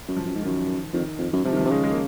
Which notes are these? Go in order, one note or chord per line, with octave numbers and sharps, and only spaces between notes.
F#2
F3
F#2
G#2
F#2 D#3
F2 D#3
F2
F#2
C3 F3
D#3
F3
C3
C#3 G#3
G#3
A#3